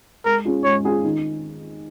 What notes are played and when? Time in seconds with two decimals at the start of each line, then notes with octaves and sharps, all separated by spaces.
0.25 G#3 A#4
0.45 C#4 F4 G#4
0.64 G#3 C#5
0.84 C#4 F4 G#4
1.04 D#3